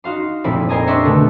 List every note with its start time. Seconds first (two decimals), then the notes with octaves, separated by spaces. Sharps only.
0.04 D#4 F#4 F5 C6
0.44 F1 A#2 C4 E4 B5
0.69 A#4 C5 D#5 G#5 A#5 D#6
0.87 D4 G4 C5 E5 C6 C#6
1.05 B2 D3 A3